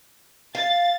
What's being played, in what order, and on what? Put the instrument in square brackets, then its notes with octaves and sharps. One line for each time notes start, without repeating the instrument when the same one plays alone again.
[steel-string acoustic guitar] F5 [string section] A6